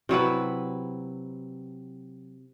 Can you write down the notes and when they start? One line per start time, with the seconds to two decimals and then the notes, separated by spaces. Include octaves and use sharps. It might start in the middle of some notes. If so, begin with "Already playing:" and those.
0.09 C3 F#3 E4 B4